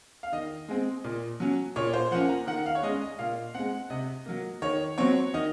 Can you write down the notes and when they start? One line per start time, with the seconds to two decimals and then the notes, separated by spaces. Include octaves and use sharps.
0.23 F5
0.32 D#3 D#5
0.68 G#3 C4
1.04 A#2
1.40 F#3 C#4
1.76 A#2 C#5
1.93 C5
2.11 F3 A#3 C#4 F#5
2.29 A#5
2.47 D#3 F#5
2.66 F5
2.75 C#5
2.83 G#3 C#4 D#5
3.01 D#5
3.19 A#2 F5
3.54 G#3 C4 F#5
3.90 C3 D#5
4.26 F#3 A#3
4.62 D#3 C#5
4.98 F#3 C4 C#5
5.34 D#3 D#5